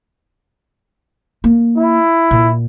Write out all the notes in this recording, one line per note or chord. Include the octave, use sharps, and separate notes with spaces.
A#3
E4
A#2